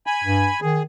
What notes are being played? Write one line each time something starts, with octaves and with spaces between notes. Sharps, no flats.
G#5 B5
G2
D#3 G#4